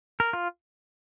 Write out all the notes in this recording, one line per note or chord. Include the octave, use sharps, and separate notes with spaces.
A#4
F4